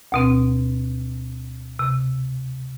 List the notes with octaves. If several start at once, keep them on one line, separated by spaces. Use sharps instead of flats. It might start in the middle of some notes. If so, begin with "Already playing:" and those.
D2 B2 C4
C3